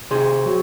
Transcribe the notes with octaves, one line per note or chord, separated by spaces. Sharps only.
C3 G#4 C5
F#3